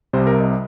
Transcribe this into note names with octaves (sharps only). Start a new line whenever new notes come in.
C2 C3 G3 C5
A#4
D#5